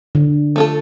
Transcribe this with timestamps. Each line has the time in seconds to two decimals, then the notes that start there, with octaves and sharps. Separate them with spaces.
0.15 D3
0.56 A3 F4 A4